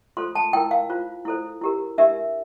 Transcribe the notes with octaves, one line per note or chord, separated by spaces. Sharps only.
F4 A4 C5 C6
A5
E4 A#4 G5
F5
F4 C5
E4 A4 C5
E4 G4 A#4
D4 G4 A#4 E5